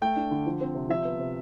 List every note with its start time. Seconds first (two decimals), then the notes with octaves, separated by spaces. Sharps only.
0.02 A3 G5
0.16 D4
0.31 D3
0.46 F3
0.61 C4
0.75 C3
0.89 F3 E5
1.05 B3
1.20 C3